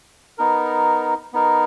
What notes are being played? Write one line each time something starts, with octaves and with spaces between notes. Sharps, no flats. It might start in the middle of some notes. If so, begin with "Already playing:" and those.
B3 D#4 A#4
B3 D#4 A#4